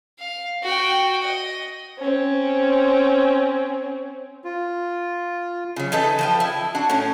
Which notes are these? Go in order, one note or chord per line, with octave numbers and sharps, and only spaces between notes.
F5
F#4 G5
D#5
C4 C#4
F4
C#3 F#3
E3 D#4 A4 B4
F3 B4 G5
E4
D4 F#4 F#5
A2 C#4